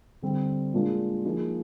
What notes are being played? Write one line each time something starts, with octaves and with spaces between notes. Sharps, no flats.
D3 G3 C4
A#2 G#3 D4 F4 G#4
F3 A#3 D#4 G#4